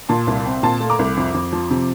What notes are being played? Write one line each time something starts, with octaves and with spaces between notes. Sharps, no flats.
A#2 A5 C6
C2
C4
A#2 A5 C6
A3
A#5 D6
C2
F2
F2
F3
C3